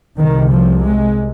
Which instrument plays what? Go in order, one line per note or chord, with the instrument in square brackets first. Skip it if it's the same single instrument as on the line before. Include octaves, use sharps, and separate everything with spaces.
[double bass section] C2 C3 D#3
F3
G#3